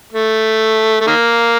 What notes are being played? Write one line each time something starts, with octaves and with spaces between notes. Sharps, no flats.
A3
A3
D#3 A#3